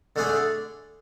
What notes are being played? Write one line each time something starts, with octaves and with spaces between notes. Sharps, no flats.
D3 A3 D4 G#4